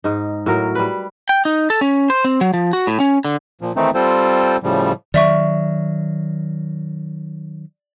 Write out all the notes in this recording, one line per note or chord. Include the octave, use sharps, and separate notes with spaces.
G#2 D#4
A2 F#3 A#4
G3 B4
G5
D#4
A4
C#4
C5
C4
F#3
F3
F#4
A2
C#4
D3
A#2 F3
D#3 E3 A3 C4 D#4
G3 C4 F4 A4 C5
A2 C#3 F3 G3
D#3 F#3 D5 E5 C#6